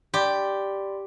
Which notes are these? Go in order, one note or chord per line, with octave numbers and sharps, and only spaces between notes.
G4 D5 B5 C6